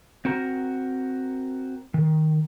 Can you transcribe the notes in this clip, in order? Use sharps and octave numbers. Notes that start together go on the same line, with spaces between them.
C4 F#4 A#4
D#3